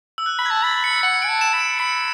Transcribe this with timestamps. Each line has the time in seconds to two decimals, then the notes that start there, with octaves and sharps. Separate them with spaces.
0.18 E6
0.26 F#6
0.39 B5
0.46 A5 G#6
0.63 B5 A6
0.84 C#7
1.03 F#5 C#7
1.22 G#5 D7
1.29 A5
1.41 E7
1.53 B5
1.60 D7
1.79 B5 C#7